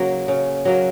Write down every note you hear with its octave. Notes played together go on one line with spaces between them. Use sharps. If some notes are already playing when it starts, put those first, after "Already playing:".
Already playing: C#3 F#3 A#3
C#3
F#3 A#3